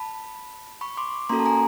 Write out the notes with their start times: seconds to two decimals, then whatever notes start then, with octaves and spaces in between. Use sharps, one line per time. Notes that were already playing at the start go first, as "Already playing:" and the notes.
Already playing: A5 B5
0.81 B5 C#6
0.97 C6 D6
1.29 A#3 C#4 F#4 A4 A#5 C6
1.39 A5
1.46 G#5 A#5